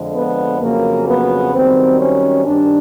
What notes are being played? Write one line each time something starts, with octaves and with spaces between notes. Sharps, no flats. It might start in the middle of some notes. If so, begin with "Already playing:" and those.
Already playing: F2 D3 F3 G#3
B3
F2 C#3 F#3 A#3
B3
F#2 D#3 G3 C4
C#4
G2 D#3 G3 D4